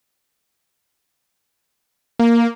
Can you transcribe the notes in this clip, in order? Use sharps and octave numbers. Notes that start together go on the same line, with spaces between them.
A#3